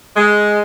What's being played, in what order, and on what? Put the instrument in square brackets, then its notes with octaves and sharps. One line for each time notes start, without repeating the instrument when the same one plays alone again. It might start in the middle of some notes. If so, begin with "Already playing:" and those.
[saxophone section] G#3